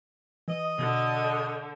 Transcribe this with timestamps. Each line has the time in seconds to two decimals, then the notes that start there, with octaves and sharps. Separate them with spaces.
0.48 E3 D#5
0.79 B2 D3